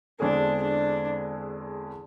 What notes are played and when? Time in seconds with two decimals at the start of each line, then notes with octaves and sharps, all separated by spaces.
0.19 E2 D3 G#3 C4 D4 G#4
0.62 D4